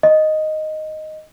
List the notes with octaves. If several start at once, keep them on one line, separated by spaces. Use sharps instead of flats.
D#5